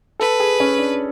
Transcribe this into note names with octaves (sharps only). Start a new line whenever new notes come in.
A4 B4
G#4
C#4
D4